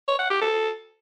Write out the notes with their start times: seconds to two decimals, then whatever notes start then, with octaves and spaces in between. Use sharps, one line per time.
0.08 C#5
0.19 F#5
0.30 G4
0.41 A4